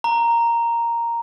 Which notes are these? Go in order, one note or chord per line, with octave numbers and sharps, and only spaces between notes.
A#5